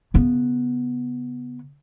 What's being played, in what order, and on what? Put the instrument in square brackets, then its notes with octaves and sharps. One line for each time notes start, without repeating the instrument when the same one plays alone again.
[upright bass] C#3 B3